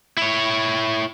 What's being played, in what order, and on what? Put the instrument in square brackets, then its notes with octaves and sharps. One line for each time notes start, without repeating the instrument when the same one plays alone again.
[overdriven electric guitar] E4 C#5